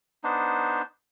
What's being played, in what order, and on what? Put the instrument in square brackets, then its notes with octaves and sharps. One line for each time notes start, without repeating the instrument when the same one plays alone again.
[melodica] B3 D4 D#4 C5